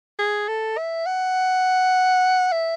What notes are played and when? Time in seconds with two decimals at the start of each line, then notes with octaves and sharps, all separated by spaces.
0.19 G#4
0.49 A4
0.78 E5
1.06 F#5
2.52 E5